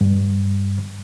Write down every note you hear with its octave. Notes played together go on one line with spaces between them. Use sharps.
G2